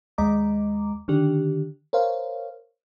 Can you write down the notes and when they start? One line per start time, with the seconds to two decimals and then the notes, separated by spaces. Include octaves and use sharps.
0.18 D#2 G#3 D#5 A#5 D6
1.08 D3 D#3 D4 G4
1.93 A#4 C5 C#5 F5